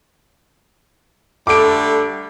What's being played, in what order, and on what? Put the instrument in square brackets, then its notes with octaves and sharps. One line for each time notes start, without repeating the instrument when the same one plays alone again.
[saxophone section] D3 G3 A3 [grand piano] D6 D7